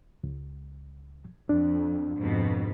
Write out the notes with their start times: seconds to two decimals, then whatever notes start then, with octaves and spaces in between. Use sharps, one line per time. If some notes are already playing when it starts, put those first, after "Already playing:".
0.24 C#2
1.49 F2 D4
2.18 F2 G#2 B2